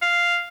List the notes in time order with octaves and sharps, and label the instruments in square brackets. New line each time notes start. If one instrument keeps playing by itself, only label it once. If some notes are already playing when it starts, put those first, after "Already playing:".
[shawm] F5